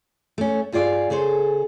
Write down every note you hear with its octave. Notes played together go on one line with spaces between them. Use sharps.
A3 C#4
G2 F4 G#4 D5 F5
C#3 G#4 A4 C5